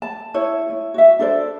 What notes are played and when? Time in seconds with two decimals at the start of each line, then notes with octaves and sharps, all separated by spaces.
0.02 A5
0.34 E4 C#5
0.70 E4
0.94 F#4 E5
1.19 D4 A4 C5 D5